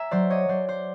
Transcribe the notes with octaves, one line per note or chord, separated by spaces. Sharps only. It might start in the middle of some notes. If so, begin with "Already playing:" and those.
Already playing: E5 G#5 A#5
F#3 C5 D5
C#5 D#5
F#3 C5 D5
C5